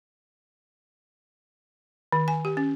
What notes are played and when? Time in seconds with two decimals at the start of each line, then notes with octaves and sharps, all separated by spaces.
2.12 D#3
2.28 G#5
2.45 G4
2.57 C#4